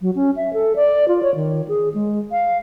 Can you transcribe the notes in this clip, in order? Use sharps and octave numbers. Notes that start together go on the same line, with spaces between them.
F#3
C#4
E5
A4
D5
F4
C#5
D#3
G#4
G#3
F5